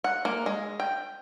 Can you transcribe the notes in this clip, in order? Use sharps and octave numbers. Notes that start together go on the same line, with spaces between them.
F#5
A#3
G#3
G5